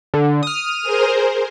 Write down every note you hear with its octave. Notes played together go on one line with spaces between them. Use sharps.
D3
D#6 F6
G#4 A#4 C5